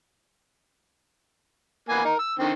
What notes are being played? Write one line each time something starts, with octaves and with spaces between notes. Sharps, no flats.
A#3 B3 G#5
D#4 A#4
E6
D3 D#3 C4